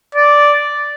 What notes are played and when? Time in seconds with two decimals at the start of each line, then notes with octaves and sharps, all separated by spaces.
0.15 D5